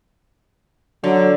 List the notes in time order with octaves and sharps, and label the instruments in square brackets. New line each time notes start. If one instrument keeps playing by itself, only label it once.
[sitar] D3 [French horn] F#3